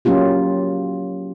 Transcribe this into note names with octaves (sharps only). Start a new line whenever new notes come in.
F#3 A#3 C#4 F4 G4